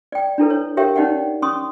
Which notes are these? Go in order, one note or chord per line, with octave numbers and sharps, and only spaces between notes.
D5 G5
D4 E4 A4 B4
C#5
G4 A#4 C#5 E5 F5 G5
C#4 D#4 D5 F#5 G5
C#4 C6 C#6 D#6